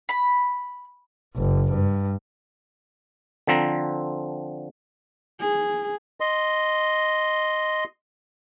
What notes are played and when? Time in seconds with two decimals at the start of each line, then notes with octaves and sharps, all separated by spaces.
0.09 B5
1.37 F#1
1.73 G2
3.47 D3 F3 C4 A#5
5.40 G#4
6.20 D#5 C6